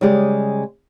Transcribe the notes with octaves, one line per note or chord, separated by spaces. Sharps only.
C#3 G3 G#3 G4 D5